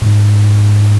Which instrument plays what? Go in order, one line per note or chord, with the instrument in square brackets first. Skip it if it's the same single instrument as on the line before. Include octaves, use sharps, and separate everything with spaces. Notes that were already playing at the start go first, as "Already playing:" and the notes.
[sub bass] G#2